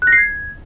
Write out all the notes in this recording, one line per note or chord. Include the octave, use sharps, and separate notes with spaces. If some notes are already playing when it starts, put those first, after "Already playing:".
F#6
A#6
C7
G#6